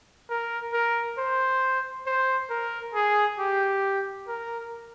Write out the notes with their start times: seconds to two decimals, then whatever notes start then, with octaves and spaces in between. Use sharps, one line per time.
0.29 A#4
0.73 A#4
1.18 C5
2.06 C5
2.50 A#4
2.95 G#4
3.39 G4
4.28 A#4